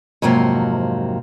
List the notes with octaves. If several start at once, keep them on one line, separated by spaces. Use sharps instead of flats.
F2 G#2 C3 F#3 A#3 C4